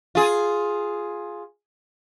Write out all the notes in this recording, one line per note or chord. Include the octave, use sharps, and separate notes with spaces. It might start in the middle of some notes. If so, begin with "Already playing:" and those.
F4 G#4